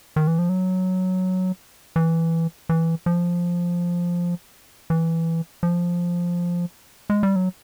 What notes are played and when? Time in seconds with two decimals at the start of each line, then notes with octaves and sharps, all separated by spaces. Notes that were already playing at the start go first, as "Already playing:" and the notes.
0.16 D#3
0.27 E3
0.39 F3
0.49 F#3
1.96 E3
2.69 E3
3.06 F3
4.90 E3
5.63 F3
7.10 G#3
7.23 G3
7.36 F#3